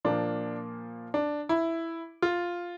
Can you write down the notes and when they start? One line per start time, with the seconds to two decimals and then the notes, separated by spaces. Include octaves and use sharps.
0.05 A#2 F3 A#3 D4
1.14 D4
1.49 E4
2.22 F4